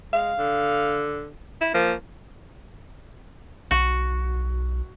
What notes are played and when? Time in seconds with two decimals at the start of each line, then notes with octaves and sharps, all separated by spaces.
0.13 G#3 F5
0.38 D3
1.61 E4
1.74 F3 A#3
3.71 B1 F#4